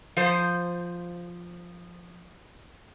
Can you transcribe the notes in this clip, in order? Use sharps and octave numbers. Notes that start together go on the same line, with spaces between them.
F3 C5